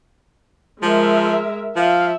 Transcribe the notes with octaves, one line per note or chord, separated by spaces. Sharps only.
F3 G#3 A#4 E5
F3 E5 F5